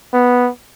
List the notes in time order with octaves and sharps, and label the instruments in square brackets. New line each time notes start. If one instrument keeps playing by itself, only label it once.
[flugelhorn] B3